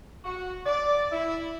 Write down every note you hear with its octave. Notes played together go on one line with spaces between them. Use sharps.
F#4
D5
E4